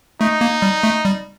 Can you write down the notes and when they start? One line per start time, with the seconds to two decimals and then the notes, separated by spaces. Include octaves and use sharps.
0.21 A3 D#4
0.41 A#3
0.62 G3
0.83 A3
1.05 G3